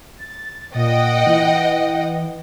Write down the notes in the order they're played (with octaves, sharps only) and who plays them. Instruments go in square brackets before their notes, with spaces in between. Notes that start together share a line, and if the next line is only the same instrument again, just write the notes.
[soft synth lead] A6
[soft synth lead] A#2 [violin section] D#5 F#5 G5
[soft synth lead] E3